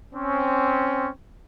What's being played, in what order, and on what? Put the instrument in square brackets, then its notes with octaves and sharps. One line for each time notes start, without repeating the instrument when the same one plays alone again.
[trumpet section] C4 C#4